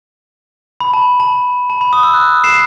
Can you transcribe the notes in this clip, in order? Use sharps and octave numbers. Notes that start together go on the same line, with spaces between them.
B5
A5
A5
A5
B5
D#6
E6
F#6
C7 E7